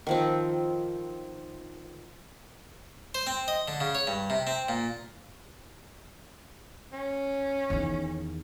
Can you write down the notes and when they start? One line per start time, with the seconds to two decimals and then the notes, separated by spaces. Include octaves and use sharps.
0.07 D#3 F3 C4
3.15 C5
3.27 C4
3.48 D#5
3.68 D3
3.80 C#3
3.95 C#5
4.07 G2
4.30 C3
4.47 C4
4.69 A#2
6.92 C#4
7.70 E2 D#3